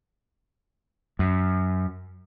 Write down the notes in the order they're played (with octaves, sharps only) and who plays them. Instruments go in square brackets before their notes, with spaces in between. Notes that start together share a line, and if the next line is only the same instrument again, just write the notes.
[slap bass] F#2